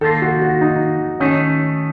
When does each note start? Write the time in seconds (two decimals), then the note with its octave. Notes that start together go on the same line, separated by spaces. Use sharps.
0.01 D#3 A#3 F4 A4
0.22 F#4
0.42 F#4
0.61 D#4
1.20 D#3 A3 C#4 D#4